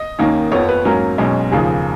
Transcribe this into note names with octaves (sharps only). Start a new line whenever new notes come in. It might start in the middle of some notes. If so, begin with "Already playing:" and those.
Already playing: D#5
D#2 D#3 A#3 C#4
F2 F3 B3 C#5
B4
G#2 F#3 A#3 C#4 A#4
B1 B2 G#3 C#4
F1 D#2 C#3 F3 G#4